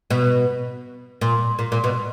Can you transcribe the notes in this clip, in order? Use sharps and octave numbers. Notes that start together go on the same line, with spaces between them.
B2
A#2
A#2
A#2
B2